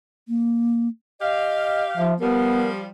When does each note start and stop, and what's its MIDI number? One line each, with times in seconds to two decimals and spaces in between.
0.28 0.88 58
1.21 2.08 67
1.21 1.85 75
1.21 2.08 77
1.97 2.15 53
1.97 2.14 76
2.20 2.87 53
2.20 2.87 55
2.20 2.68 59
2.20 2.69 70